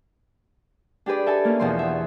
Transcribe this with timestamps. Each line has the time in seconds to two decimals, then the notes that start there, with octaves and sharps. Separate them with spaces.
1.06 D4 G4 G#4 B4 D5
1.26 A4 E5 G#5 A5
1.45 A#3 C#4
1.59 E2 B2 F3 C6
1.79 E5